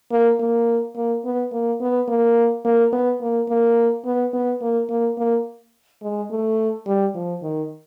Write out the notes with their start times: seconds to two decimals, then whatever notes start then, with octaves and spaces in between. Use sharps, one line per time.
0.11 A#3
0.40 A#3
0.96 A#3
1.25 B3
1.52 A#3
1.81 B3
2.08 A#3
2.65 A#3
2.92 B3
3.21 A#3
3.49 A#3
4.05 B3
4.33 B3
4.62 A#3
4.90 A#3
5.18 A#3
6.02 G#3
6.30 A3
6.86 G3
7.15 F3
7.42 D#3